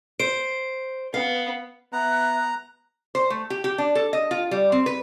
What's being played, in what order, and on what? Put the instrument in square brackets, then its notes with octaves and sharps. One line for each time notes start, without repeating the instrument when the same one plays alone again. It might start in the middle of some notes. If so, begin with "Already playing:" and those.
[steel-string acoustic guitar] C5 [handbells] D7
[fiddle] B3 [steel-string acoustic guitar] F5
[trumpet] B3 [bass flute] E5 [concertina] A#5 [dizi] F#6
[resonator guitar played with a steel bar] C5
A3
G4
G4
D4
A4
D#5
F4
G3
C4
B4